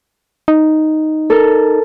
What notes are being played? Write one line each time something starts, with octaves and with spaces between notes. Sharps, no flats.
D#4
A4 A#4